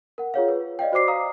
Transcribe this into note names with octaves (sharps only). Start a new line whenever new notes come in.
A#4 F#5
F4 G#4 C#5 F5
B4
D5 D#5 F5 G5
F#4 C5 D5 D6 C7
F5 A#5 D#6